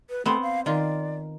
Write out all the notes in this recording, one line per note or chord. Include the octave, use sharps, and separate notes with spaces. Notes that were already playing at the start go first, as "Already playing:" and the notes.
B4
A3 B3 C4 C5
F5
D#3 F4 D5